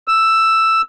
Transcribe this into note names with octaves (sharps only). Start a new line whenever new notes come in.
E6